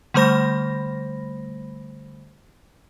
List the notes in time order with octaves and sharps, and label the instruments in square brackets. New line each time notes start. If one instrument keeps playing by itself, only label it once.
[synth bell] D3 G3 A3 C5 B5 A#6